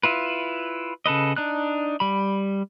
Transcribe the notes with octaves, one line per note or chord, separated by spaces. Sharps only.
E4 F4 B4
C#3 A4 B4 D#5
D4 D#4 F#6
G3 B5